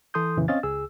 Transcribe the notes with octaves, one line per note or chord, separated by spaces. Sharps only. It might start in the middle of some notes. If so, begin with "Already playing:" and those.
E3 A4 C6 D#6 G6
F2 A#2 C#3 E3
C4 C#4 D#5 F5 A6
C#2 G#4 E6